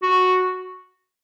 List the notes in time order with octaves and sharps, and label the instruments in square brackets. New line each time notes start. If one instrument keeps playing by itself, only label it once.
[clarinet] F#4